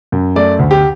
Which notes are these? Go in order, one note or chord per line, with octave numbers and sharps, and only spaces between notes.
F#2
A3 D5
D2
G4